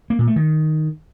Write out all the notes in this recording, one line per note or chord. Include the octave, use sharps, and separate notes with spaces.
A#3
A#2
A3
D#3